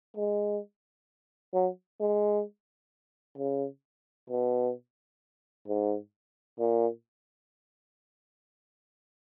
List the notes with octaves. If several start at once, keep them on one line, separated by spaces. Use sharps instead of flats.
G#3
F#3
G#3
C#3
B2
G#2
A#2